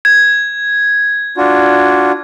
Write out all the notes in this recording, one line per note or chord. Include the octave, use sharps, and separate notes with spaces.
G#6
D4 F4 F#4